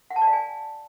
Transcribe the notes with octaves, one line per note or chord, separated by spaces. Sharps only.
F#5
A5
D5
F5
G#5